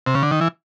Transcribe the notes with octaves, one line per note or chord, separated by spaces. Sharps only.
C3
C#3
D3
D#3
E3